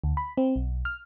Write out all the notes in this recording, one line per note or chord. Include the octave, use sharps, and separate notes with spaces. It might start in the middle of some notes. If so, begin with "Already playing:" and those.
D2
B5
C4
B1
F6